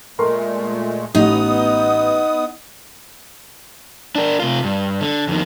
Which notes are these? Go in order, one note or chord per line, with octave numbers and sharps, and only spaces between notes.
A#2 G#3 A3 A#4 C6
A1 B3 D#4 D#6
D4 A#4
C3 F4
G2
D3
F2 D#3